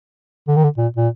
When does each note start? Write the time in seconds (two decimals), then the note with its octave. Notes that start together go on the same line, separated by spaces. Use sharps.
0.48 D3
0.56 D#3
0.64 D3
0.78 A#2
0.97 A#2